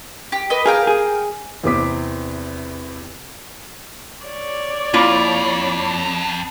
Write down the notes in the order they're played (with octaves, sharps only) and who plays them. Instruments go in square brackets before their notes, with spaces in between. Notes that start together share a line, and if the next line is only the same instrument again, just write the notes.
[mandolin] G4
B4 D#5
[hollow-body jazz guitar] G#4 [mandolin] A#4 F5 G5
[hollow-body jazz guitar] G#4
[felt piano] E2 C3 B3 C4 D6 B6
[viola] C#5 D5
[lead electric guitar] F2 [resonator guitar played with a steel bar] A#3 E4 F4